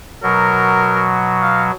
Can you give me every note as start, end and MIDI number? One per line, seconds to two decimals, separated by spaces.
0.23 1.71 47
0.23 1.71 54
0.23 1.05 70
1.42 1.64 77